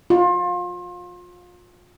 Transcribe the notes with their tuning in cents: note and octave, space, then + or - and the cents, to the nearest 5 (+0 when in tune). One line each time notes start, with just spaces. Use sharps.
F4 +30